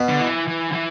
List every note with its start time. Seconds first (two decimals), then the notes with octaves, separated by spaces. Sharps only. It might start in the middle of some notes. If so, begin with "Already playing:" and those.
Already playing: B2
0.09 D3
0.21 E3
0.48 E3
0.70 D3
0.74 E3